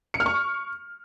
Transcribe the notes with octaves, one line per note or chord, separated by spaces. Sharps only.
C#7
F6
C#6